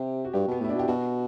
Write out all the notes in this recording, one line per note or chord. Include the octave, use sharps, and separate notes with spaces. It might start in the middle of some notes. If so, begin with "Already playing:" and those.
Already playing: C3 G4
F#4
G2 G4
B2 B3
A2 E4
D4
B2
G4
B2 F#4